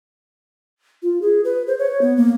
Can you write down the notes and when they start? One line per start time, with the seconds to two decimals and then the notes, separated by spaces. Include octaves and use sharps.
1.03 F4
1.22 G#4
1.44 B4
1.67 C5
1.79 C#5
2.01 B3
2.17 A#3